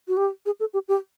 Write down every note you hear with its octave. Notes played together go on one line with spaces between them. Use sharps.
F#4
G4
G#4
A4
G4
G4